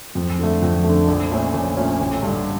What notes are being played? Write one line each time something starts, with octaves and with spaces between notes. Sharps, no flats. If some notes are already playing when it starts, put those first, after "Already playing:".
F2
D3 A3
F2
D3 A3
A#1
A#2 A3 C#4
A#1
A#2 A3 C#4
A1
G2 D3